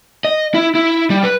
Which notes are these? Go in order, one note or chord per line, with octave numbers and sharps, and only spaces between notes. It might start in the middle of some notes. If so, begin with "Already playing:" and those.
D#5
E4
E4
G3
B4